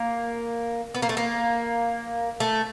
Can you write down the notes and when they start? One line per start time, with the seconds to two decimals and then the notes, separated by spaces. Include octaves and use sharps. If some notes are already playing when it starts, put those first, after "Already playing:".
Already playing: A#3
0.95 B3
1.02 A#3
1.09 A3
1.17 A#3
2.40 A3